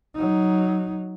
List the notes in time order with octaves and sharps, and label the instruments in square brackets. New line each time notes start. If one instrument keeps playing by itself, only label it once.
[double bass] F#3 D#4